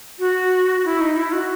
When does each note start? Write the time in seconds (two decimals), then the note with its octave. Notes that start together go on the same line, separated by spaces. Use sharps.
0.19 F#4
0.85 E4
1.01 D#4
1.17 E4
1.32 F#4